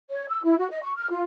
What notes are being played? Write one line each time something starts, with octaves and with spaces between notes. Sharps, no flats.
C#5
E6
E4
F#4
D#5
C#6
F6
F4